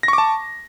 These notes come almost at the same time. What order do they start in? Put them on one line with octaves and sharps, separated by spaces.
A#6 C#6 D6 A5